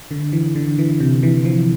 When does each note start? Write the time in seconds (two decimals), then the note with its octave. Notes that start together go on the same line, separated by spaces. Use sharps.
0.11 D3
0.33 E3
0.55 D3
0.79 E3
1.00 C3
1.23 E3
1.45 F3